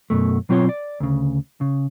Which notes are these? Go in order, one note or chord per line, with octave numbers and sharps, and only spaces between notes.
F#2 B2 A3
B2 F#3 C4 F4 C#5 C6
D5
D2 C#3
C#3